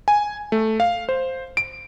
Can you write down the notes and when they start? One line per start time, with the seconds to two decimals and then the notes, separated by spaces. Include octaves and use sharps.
0.08 G#5
0.52 A3
0.80 F5
1.09 C5
1.57 D7